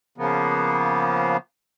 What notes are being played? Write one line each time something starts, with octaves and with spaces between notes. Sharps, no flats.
C#3 F3 A#3 B3